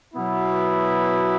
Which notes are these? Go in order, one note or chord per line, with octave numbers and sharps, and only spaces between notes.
B2 F#3 B3 E4